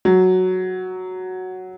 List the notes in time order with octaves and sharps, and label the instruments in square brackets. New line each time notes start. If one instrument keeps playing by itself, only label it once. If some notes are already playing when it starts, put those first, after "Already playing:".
[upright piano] F#3